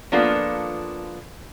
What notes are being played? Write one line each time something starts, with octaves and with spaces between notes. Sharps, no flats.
F3 A#3 B3 D4 F4 A4